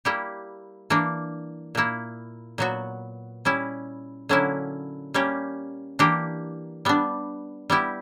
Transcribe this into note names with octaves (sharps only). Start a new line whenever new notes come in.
G3 A#3 E4 G4
E3 A#3 D4
A#2 A#3 E4
A#2 F#3 B3 F#4
G3 C#4 E4
D3 F#3 A#3 C#4 E4
G3 A#3 C#4 G4
E3 A#3 D4 G4
G3 B3 D4
G3 B3 E4 G4